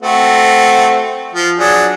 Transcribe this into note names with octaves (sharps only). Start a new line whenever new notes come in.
A3 C4 F#4
F3
F#3 D4 G#4